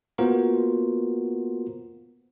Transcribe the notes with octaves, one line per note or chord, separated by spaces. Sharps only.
A#3 B3 F4 F#4 A#4 C5